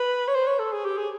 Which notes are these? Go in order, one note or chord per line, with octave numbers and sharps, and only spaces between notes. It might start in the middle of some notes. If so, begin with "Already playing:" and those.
Already playing: B4
C#5
C5
C#5
A4
G#4
G4
G#4